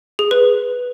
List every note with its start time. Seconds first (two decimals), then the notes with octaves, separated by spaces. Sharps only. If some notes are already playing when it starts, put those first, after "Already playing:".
0.19 G#4
0.31 B4